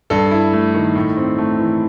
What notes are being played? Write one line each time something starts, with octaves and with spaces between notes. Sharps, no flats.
G2 A4
E4
A3
D#3
A2
C4
A3
E3